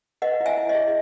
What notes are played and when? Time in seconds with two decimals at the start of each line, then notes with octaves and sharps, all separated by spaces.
0.22 B4 D#5 F#5
0.40 E4
0.46 E5 G#5
0.57 E4
0.69 D#5
0.75 G#4